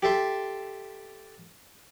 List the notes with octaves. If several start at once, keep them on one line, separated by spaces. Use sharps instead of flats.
G4 A4 E5 C6